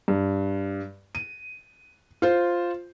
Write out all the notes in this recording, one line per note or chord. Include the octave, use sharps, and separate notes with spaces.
G2
D#7
F4 C5